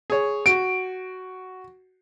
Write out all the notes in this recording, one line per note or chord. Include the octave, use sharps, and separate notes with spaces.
G#4 C#5
F#4 D7